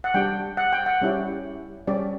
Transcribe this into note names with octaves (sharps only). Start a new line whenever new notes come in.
F#5
G3 D4 G4 G5
F#5
G5
F#5
G3 C#4 E4 G4
G3 C#4 G4 D5